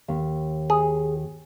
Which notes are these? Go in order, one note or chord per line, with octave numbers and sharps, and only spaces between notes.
D#2
G#4